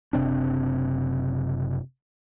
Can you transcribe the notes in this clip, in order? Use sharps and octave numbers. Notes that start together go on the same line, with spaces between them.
F#1 C3 C4 D4